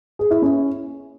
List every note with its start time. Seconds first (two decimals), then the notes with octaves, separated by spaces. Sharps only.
0.19 G#4
0.31 E4
0.42 C#4